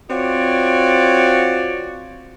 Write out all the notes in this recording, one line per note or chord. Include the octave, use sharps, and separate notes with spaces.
C4 F4 F#4 C#5 D5